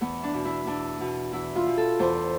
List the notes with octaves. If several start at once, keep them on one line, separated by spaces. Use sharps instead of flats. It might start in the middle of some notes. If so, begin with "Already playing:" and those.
E2 B3
D4
B2
E4
E2 D4
B2
E2 E4
F4
B2
A4
E2 C5